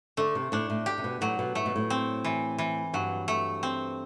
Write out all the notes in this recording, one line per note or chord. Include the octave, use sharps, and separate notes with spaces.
D3 A3
C3
A2 D4
A2
G4
C3
B2
A2 F#3
B2
A2 A3
B2
A2
C4
E3
E3
G2 F#3
A3
C4